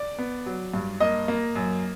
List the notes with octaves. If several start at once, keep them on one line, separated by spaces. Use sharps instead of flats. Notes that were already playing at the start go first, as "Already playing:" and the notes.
Already playing: D5
B3
F#3
G2
A#3 D#5
A#3
F#2